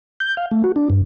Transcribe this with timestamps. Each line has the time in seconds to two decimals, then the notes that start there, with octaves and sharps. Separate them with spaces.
0.20 G6
0.37 F5
0.51 A3
0.64 F#4
0.76 D4
0.90 G2